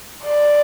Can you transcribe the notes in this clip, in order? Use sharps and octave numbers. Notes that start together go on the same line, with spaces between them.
D5